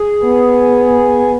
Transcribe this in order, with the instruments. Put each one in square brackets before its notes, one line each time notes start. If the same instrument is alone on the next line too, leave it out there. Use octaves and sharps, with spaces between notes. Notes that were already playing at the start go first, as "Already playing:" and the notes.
Already playing: [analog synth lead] G#4
[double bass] B3